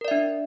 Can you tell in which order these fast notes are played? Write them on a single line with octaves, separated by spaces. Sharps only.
A#4 D5 E5 D4